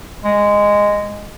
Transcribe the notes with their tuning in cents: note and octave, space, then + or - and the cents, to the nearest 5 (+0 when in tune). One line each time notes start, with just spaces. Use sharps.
G#3 -10